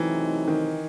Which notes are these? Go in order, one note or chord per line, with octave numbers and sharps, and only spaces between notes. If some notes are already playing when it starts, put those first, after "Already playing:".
Already playing: C3 E3 F#3 A3 C4 D#4
D#3